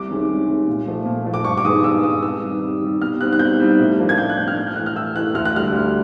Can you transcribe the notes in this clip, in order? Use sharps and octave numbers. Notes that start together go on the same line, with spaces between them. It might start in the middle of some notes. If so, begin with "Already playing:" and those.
Already playing: C2 D6
C3 D#3 G#3 C#4
C2
C3 D#3 G#3 C#4
A#2
F3 A3
A#2
F3 A3
D6
G2 C#6
D6
D#3 G#3 B3 D#6
G2 E6
D#3 G#3 B3 D#6
C3 E6
D#3 G3
C3
D#3 G3
B2 F6
G3 C4 D#4 F#6
F#6
B2 G6
G3 C4 D#4
A2
F3 A#3 D4
G#6
A2 G6
F#6
F3 A#3 D4 G6
F6
A2 F#6
G6
E3 A3 F#6
F6
A2 E6
E3 A3 F#6
D2 F6
F#6
D3 G3 F6
D2